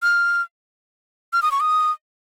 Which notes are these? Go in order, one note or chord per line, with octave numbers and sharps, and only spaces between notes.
F6
F6
D#6
C#6
D#6